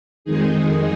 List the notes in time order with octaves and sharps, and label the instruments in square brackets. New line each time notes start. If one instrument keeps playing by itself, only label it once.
[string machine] F2 D#3 G#3 D#4 G#4